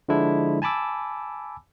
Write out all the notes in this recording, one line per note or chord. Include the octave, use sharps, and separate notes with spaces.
D3 F3 G#3 D4 E4
G#5 A5 B5 D6 E6